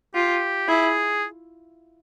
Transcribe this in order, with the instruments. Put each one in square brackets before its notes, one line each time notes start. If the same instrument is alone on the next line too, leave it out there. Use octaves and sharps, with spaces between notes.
[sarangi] F4 [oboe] G4
[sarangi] E4 [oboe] G#4